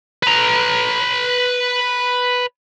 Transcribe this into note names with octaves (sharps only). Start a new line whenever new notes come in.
B4 A#5